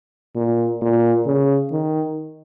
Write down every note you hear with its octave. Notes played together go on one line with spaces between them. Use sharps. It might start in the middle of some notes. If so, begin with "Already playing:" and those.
A#2
A#2
C#3
D#3